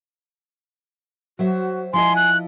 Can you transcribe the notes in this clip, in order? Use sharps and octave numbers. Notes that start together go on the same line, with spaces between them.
F#3 F#4 C5 E5
F3 E4 D#5 G#5 C6
F#6